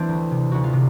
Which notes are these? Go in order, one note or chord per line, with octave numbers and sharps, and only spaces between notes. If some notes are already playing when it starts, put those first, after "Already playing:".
Already playing: E3 C4 D4
D2
C3
D2 F#4
F4
C3